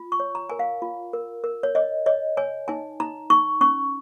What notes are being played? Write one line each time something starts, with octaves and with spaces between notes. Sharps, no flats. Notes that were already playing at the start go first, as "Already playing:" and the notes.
Already playing: F4
C#6
C#5
A#5
A#4 G#5
F5
F4
A#4
A#4
C#5
C#5 D#5
C#5 D#5
C#5 G#5
D#4 G#5
D#4 A#5
D#4 C#6
C#4 C#6